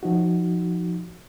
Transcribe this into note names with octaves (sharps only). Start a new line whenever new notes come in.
F3 D#4 F#4